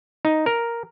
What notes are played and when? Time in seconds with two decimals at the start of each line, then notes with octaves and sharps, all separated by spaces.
0.25 D#4
0.46 A#4